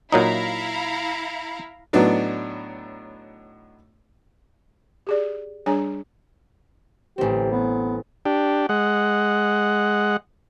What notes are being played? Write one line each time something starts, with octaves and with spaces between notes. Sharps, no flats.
A#2 F#3 D#4 E4 F5 A#5
A2 F#3 B3 D4 D#4
G4 G#4 D5
G3 D4 G#4 C#5 G#5 A#5
A1 C4 G4
B3
D4 G4
G#3 F#5